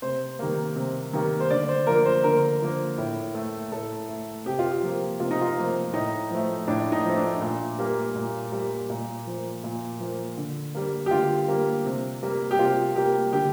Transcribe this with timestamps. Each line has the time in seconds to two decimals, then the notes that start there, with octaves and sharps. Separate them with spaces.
0.02 C3 C5
0.39 D#3 G3 A#3
0.76 C3
1.13 D#3 G3 A#3
1.40 C5
1.50 D3 D5
1.69 C5
1.87 F3 A#3 A#4
2.05 C5
2.24 D3 A#4
2.62 F3 A#3
2.98 A2
3.34 A3
3.72 A2 A4
4.09 A3
4.46 C3 G4
4.59 F4
4.71 G4
4.83 F3 A#3
5.20 C3 F4
5.31 D#4
5.41 F4
5.57 F3 A#3
5.93 A2 D#4
6.31 F3 A3
6.68 A2 D4
6.92 D#4
7.05 F3 A3
7.17 D4
7.41 A#2
7.79 G3 A#3
8.16 A#2
8.52 G3 A#3
8.90 A#2
9.27 F3 A#3
9.64 A#2
10.00 F3 A#3
10.37 D3
10.74 G3 A#3
11.06 G4
11.11 D3 F4
11.48 G3 A#3
11.86 C3
12.23 G3 A#3
12.51 G4
12.59 C3 F4
12.96 G3 A#3 G4
13.33 D3 G4